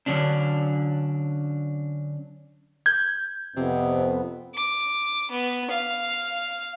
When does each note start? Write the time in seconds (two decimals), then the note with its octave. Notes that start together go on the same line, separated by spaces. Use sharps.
0.06 D3 F#3 C#4 D4
2.86 G6 G#6
3.56 F2 C3 B3
4.55 D6
5.31 B3
5.70 F5